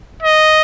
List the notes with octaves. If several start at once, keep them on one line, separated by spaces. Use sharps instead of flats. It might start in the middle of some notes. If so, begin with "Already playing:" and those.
D#5